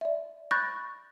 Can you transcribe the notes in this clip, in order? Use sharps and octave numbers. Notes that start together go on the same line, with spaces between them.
D5 E5
B5 C#6 F#6 G6 A6 A#6